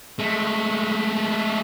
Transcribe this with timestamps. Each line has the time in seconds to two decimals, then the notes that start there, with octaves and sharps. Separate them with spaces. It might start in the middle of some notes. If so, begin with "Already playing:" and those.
0.19 G#3 A3